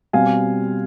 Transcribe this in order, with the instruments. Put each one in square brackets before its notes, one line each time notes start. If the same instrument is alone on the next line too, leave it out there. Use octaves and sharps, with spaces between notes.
[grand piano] B2 G3 C4 F5 G#5